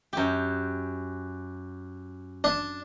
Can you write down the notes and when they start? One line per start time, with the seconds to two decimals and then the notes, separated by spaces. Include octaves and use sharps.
0.13 F#2 G4
2.44 D4